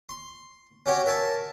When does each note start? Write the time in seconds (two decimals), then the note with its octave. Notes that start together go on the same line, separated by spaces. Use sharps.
0.09 C6
0.86 C#4 F#4 G4 C#5
1.06 A#4 E5 G#5 A5